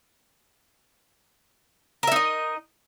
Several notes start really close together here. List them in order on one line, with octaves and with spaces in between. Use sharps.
A#4 E5 D#4 D#5